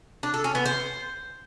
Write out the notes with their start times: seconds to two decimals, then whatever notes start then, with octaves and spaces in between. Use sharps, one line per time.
0.23 D4
0.34 A4
0.44 C#4
0.55 B3
0.65 C5